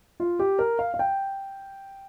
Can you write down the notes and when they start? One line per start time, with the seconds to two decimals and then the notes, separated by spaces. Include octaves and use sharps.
0.20 F4
0.39 G4
0.59 A#4
0.79 F5
0.94 F5
0.99 G5